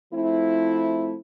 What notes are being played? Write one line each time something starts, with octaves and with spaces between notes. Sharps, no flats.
F3 A3 C4 E4